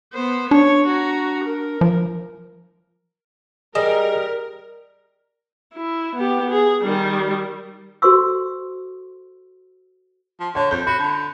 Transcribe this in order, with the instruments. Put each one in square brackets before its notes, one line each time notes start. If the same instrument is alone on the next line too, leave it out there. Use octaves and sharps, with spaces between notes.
[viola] B3 C5
[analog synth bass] D4 [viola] C#5
[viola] F#4 A#5
A#4
[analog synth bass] F3
[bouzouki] G3 [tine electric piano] G#4 D#5 [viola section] A#4
[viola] E4
B3 G4
G#4
D#3 G3
[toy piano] F#4 A4 C5 C6 C#6 E6
[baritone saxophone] F3
[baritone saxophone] D3 [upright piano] C#5
[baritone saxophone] F2 [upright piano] G6
[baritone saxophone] F#4 [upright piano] B5
[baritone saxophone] D3